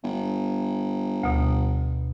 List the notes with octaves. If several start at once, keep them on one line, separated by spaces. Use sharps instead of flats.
G1
D2 B2